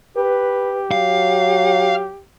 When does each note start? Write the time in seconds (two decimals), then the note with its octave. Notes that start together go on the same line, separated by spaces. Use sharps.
0.17 G4 B4
0.91 F#3 F5